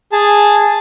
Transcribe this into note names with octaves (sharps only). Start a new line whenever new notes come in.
G#4 A5